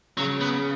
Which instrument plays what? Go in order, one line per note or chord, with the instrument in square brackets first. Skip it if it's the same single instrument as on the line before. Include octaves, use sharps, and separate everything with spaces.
[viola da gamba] C#3 [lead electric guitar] F#3
[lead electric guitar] B3